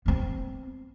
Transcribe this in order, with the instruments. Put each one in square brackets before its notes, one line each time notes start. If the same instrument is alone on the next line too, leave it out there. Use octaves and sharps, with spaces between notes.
[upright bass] B3 C4